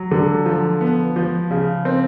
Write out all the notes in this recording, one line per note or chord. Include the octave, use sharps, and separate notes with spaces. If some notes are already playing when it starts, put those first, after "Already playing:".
Already playing: F#3
D3
F3
B3
F3
C#3
C4